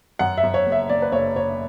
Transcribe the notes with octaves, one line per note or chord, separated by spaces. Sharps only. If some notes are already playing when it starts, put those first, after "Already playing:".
F#2 F#5
E5
F#2
C#5
F#1
E5
F#1 D5
B4
F#1 C#5
F#1 C#5